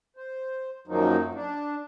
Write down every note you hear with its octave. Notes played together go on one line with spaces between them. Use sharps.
C5
F#2 D#3 F3 F#3 A#3 D#4
D4